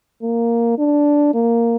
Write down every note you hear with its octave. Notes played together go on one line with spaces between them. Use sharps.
A#3
D4
A#3